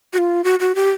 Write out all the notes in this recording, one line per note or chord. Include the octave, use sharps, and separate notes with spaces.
F#4
F4
F#4
F#4
G4